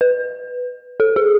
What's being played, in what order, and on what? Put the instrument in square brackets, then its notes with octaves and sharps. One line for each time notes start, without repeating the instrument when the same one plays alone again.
[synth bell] B4
A4
G#4